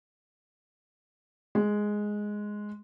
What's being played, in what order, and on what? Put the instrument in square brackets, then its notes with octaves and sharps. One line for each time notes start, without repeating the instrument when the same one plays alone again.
[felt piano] G#3